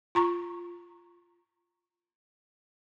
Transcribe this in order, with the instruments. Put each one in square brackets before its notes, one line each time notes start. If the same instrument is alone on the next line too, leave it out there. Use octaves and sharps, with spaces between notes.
[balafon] F4 A#5 C#6